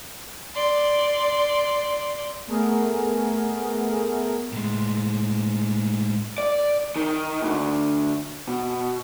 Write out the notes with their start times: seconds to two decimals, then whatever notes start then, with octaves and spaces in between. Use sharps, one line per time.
0.55 D5 C6
2.48 A3 B3 G#4 A#4
4.52 A2 G#3
6.38 D5
6.96 D#3
7.42 D2
8.48 B2